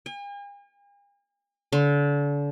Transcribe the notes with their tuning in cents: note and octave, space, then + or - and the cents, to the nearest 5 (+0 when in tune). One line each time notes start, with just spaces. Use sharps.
G#5 -45
D3 -35